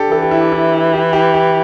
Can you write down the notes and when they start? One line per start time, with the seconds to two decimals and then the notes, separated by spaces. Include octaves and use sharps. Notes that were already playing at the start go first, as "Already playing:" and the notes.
Already playing: D4 G4 A4
0.12 E3 A4
0.22 G4
0.31 E4
0.41 G4
0.52 E4
0.93 G4
1.13 G4
1.34 G4